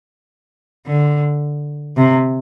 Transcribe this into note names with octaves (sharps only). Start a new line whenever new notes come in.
D3
C3